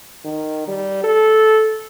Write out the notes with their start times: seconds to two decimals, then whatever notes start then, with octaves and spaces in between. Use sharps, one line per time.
0.25 D#3
0.68 G3
1.04 A4